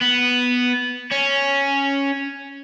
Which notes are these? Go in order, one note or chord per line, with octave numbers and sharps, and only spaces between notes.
B3
C#4